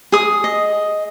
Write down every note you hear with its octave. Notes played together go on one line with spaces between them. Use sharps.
G#4 D#6
D#5